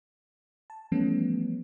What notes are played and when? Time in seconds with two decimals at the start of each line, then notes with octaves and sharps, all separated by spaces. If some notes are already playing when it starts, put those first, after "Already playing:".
0.70 A5
0.92 E3 F3 G3 A3 B3 C#4